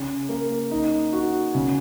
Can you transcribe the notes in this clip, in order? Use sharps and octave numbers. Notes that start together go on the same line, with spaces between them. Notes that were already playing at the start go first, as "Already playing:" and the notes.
Already playing: C#3
A#3
D#4
F#4
C#3